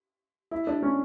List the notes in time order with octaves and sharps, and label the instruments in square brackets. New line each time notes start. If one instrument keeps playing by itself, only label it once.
[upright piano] E4
D4
C#4